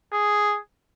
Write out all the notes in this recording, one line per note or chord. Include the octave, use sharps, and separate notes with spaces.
G#4